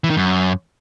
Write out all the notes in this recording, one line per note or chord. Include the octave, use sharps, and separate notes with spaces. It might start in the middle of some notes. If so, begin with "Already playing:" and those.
E3
D#3
F#2